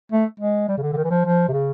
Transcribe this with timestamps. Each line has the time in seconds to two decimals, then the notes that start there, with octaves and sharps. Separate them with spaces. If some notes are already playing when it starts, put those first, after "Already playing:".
0.12 A3
0.40 G#3
0.68 G3
0.78 C#3
0.82 D3
0.93 D3
0.97 D#3
1.04 E3
1.10 F3
1.25 F3
1.49 C3
1.53 C#3